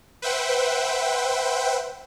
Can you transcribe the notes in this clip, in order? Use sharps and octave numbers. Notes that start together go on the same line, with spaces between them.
B4 C5 E5 F#5 G5